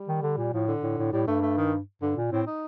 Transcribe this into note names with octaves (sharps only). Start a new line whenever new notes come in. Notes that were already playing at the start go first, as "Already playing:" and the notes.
Already playing: G3
D#3
D3
A#2
A2 F3
D3
A2
A2
A2 G3
G2 A3
A3
D#3
G2 D3
A#2
A2 C4
D#4